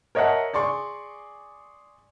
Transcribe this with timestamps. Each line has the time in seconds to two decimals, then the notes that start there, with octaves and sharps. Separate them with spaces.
0.15 A#4 C#5 D#5 E5 F#5 A5
0.53 G#4 D5 C6 C#6